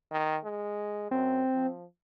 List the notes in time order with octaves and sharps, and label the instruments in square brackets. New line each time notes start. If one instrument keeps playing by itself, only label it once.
[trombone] D#3
G#3
[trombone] F#2 [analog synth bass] C4
[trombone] F3